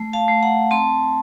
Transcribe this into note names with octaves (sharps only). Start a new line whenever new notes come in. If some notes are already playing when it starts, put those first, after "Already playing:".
Already playing: A3
F5 A5
A3
F#5 A#5
C4 A5 C6